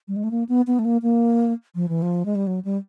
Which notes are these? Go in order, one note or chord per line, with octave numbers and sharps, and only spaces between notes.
G3
G#3
A3
A#3
B3
B3
A3
A#3
A#3
F3
E3
F3
G#3
G3
F#3
G3